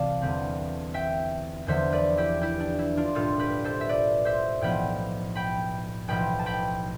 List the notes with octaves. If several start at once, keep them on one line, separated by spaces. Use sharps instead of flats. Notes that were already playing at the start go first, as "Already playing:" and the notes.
Already playing: C2 C3 E3 D5 F5 A5
E2 D3 G3 C4
E5 G5
E2 D3 F3 B3 C5 E5
B4 D5
E4 G4
E4 G4
D4
E4
D4 F4
B1 A2 G3 F4 A4
G4 B4
A4 C5
E5
B4 D5
C5 E5
B1 A2 F3 B3 G5 B5
G5 B5
B1 A2 F3 G5 B5
A5
G5 B5